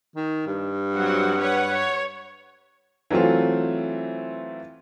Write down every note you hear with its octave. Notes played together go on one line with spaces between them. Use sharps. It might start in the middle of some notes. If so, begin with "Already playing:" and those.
D#3
G2
F#3 C4 F#5
B4 C#5 F#5
C#5
E3 F#3 A3 C4 F4